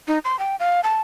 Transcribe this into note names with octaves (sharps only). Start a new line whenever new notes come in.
D#4
C6
G5
F5
A5